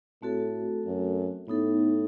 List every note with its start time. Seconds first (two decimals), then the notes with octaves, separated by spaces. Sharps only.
0.22 A2 A3 C4 F#4 A4
0.86 F#2
1.48 A2 B3 D#4 A4